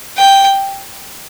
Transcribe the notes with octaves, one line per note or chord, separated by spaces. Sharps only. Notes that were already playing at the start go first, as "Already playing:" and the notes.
G5